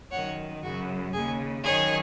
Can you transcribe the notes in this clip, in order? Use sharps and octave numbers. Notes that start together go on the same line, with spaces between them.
F#2 D#3 C#5 F#5
F#2 C#3 F#4
D#2 C#3 G#4
F#2 D#3 G#4 C#5